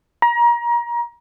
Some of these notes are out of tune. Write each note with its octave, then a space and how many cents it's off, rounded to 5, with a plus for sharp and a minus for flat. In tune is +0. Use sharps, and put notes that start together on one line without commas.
A#5 +30